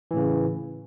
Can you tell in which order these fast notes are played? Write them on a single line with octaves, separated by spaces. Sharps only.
E3 A2 C#3